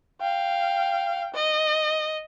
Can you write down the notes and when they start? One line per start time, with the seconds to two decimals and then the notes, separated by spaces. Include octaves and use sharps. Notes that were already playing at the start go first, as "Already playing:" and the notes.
0.21 F5 G5
1.34 D#5